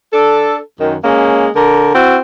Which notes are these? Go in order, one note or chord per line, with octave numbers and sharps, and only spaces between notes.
D4 A4
F#2 D#3
G#3 A#3 C#4
D3 A#4
C4 E4 F#4